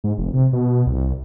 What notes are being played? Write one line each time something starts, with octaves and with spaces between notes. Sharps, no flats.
G#2
F1
C3
B2
C2